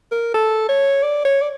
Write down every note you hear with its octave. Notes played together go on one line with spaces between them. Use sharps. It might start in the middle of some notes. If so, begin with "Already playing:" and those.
A#4
A4
C#5
D5
C#5
D5